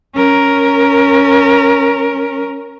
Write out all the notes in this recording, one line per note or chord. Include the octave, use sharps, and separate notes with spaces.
C#4 A#4